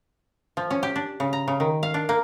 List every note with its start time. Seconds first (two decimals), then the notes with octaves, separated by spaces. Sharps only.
0.57 F3
0.70 C#4
0.83 G4
0.96 D4
1.20 C#3
1.33 A#5
1.48 C#3
1.60 D#3
1.83 F5
1.94 D4
2.09 A#3